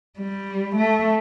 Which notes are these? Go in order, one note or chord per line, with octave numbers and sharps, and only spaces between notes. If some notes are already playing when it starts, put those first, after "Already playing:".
G3
A3